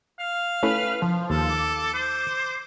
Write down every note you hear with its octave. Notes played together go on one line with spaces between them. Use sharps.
F5
A3 C#4 E4 B4
F3
D#2 A4
D6
C5